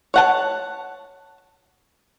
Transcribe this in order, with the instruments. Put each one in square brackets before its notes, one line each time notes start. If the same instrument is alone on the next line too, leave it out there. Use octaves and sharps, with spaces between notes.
[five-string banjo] C#5 F#5 A5